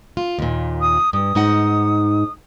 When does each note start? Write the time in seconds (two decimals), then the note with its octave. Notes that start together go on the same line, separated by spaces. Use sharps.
0.17 F4
0.39 D#2 A#2
0.81 D#6
1.13 G2 D#6
1.35 G#2 D#4 F#5